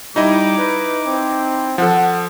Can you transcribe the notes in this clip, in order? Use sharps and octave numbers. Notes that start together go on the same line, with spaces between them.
G3 D#4 E4 D#5 D6
B4
C4
F3 A4 F#5